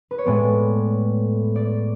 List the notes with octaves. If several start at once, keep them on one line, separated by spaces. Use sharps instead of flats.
B4
C#5
A2 G#3 B3 D5
D5